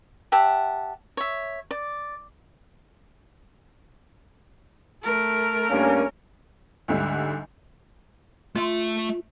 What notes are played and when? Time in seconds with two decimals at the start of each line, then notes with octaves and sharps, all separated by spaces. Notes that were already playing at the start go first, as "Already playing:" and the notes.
0.32 G4 E5 F#5 A5
1.17 C#5 E5
1.71 D5
5.04 A3 A#4
5.70 G2 A#3 C#4
6.88 D2 G#2 D3 G3
8.56 A3 F4 E5